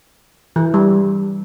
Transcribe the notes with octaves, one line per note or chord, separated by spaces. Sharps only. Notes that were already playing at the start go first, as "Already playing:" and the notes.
E3
G3